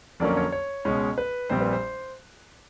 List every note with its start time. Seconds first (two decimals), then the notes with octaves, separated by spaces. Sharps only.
0.20 F2 D3 F#3 A#3 C#4 D5
0.37 C#5
0.52 C#5
0.85 C#2 B2 G#3 C#4
1.18 B4
1.50 A#1 A#2 G3 C4 C5
1.61 B4
1.73 C5